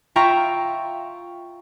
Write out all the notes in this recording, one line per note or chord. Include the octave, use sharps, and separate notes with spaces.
F4 E5 G5 A#5 C#6